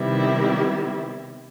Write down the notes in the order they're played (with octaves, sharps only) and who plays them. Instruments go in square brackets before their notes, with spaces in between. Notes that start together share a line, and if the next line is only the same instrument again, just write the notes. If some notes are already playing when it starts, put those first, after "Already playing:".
Already playing: [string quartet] C3 D#3 G3 B3 E4